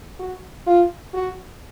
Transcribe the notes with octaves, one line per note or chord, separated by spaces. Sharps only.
F#4
F4
F#4